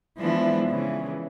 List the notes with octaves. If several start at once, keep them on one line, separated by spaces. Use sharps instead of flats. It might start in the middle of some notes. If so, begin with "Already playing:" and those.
E3 F3 G#3 B3 D4 E4
C#3 E3